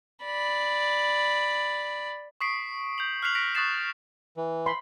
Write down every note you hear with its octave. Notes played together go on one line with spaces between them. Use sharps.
D5 B5
C#6 D#6 B6 C7 D7
G6 F7 F#7
F6 F#6 B6 C7 F7 F#7
A#6 B6 D7 F7
C#6 D#6 F#6 A6 C7 E7
E3
B5 C6